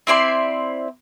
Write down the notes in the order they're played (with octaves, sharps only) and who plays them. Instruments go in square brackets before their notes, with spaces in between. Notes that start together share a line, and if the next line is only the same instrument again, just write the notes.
[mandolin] C4 E4 D5 C6